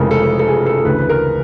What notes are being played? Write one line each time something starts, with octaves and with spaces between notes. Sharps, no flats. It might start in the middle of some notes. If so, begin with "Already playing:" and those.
Already playing: F1 F2 C#3 E3 G#3 A4 A#4
A4
A4
G#4
A4
D2 C#3 E3 B4
B4
A#4